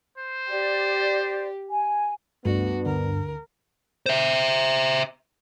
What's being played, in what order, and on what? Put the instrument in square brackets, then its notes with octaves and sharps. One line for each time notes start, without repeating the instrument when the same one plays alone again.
[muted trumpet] C5
[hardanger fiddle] G4 [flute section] D5
[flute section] G#5
[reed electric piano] C#2 A3 [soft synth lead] G2 [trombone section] B3 D4 [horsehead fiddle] F#4
[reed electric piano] D2 D3 [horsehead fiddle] A#4
[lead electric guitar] C5 E5